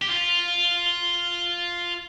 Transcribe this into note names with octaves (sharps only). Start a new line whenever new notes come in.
G4
F4